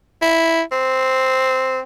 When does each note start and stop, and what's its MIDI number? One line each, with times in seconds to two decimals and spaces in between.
0.22 0.62 64
0.72 1.80 60